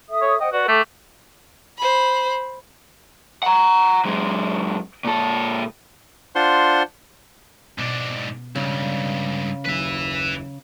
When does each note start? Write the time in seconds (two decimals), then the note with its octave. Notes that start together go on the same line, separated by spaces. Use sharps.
0.09 A4 E5 D#6
0.21 C#5
0.40 C5 D#5 F#5 G5
0.52 F#4 B4 D5 F#5
0.68 A3 A4 G5 D6
1.78 C5 B5
3.43 F#5 A#5
4.05 F#2 G#3
5.04 A#2 A4
6.35 D4 F4 C5 F#5 C6
7.78 G#2 B2 D4
8.56 C#2 G2 C#3
9.65 F#1 D#2 B4 E5